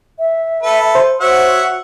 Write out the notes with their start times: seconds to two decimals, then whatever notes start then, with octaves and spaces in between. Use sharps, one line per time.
0.19 E5
0.63 A4 B4
0.95 C5
1.20 F#4 C#5 E5 F#5